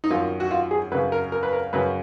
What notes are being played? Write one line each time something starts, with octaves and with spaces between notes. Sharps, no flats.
D#4
F#2 D#3 F4
F#4
F4
G#4
F#2 C#3 B4
A#4
A#4
B4
A#4
F#2 C#3 B4